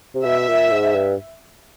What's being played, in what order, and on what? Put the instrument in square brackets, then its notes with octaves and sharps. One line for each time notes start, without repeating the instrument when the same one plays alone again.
[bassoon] C3
[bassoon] B2 [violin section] E5
[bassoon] A#2
G#2
G2